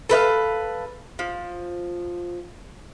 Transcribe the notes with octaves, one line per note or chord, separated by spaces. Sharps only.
A4 B4 D#5 F5
F3